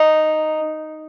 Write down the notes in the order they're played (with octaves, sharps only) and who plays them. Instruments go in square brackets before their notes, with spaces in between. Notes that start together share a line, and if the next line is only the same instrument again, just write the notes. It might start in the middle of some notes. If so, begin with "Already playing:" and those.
Already playing: [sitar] D#4